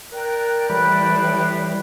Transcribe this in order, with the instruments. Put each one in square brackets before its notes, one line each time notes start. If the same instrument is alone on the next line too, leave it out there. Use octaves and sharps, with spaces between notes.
[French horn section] A#4 [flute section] D5 G5 F#6
[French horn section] A2 [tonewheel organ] E3 G3 [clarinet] B5